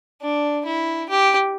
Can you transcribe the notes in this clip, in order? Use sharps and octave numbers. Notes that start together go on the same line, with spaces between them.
D4
E4
G4